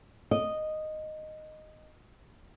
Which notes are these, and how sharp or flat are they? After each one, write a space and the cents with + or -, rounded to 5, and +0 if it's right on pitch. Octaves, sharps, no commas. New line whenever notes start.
D#5 -5